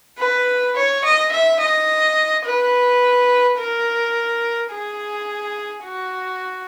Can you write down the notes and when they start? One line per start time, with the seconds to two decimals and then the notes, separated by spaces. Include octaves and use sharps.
0.18 B4
0.76 C#5
1.04 D#5
1.32 E5
1.60 D#5
2.45 B4
3.58 A#4
4.71 G#4
5.85 F#4